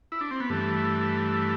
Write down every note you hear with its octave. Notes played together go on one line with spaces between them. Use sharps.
E4
D4
C4
B3
G2 E3 A3